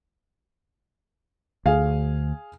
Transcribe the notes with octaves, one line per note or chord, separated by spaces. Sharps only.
D2 G#4 F5 G#5